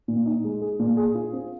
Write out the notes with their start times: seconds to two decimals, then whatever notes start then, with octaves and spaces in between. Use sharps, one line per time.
0.08 A#2
0.26 D#4
0.44 G#3
0.61 G#4
0.79 A#2
0.97 G#4
1.15 F4
1.33 C4